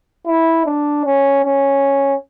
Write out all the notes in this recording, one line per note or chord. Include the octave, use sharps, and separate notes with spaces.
E4
D4
C#4
C#4